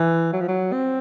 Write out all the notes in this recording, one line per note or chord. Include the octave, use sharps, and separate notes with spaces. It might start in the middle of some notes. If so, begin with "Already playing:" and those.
Already playing: E3
F#3
F3
F#3
C4